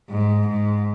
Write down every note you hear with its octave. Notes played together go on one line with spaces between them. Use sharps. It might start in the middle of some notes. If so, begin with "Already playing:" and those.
G#2
G#2